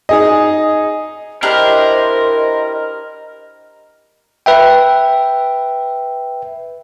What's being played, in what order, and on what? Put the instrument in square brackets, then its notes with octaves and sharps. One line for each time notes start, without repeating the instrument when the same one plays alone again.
[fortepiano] D#4 G#4 D#5
[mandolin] D4 E4 G4 [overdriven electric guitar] A#4 [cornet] C5 [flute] D#5
[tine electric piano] B4 E5 G5